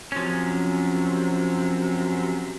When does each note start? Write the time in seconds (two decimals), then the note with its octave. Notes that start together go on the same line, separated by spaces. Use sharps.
0.12 F#2 C3 F3 C#4